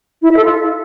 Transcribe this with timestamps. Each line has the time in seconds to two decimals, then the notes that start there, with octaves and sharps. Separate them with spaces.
0.22 E4
0.29 E5
0.37 A4
0.44 F4